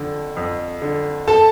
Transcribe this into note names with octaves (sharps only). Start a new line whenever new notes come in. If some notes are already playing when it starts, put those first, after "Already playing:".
Already playing: F2 D3
F2
D3
A4 A5